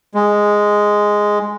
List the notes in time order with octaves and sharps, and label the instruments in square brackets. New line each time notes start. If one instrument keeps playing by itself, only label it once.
[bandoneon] G#3